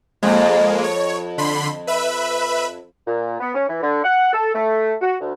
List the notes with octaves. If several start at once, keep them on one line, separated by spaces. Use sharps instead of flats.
F2 G#3 A#3
C#5
D3 B5 C6
B4 E5 B5
A#2
B3
C#4
E3
D3
F#5
A4
A3
F#4
D2